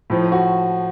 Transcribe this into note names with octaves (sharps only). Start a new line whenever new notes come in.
A2 F3
F#4